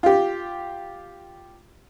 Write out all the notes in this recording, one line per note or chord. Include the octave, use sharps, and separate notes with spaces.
F4 G4